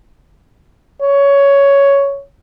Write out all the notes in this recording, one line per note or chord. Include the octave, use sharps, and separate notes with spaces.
C#5